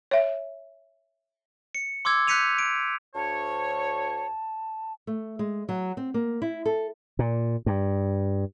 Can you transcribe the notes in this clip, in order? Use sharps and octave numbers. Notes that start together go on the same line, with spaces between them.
C#5 E5
C#7
C6 D6 E6 G#6
F#6 G6 B6 C#7 D#7 F7
D7
D2 C#5 A5
A3
G#3
F#3
C4
A#3
E4
A4
A#2
G2